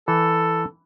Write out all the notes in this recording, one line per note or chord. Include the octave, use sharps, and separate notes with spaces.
E3 A4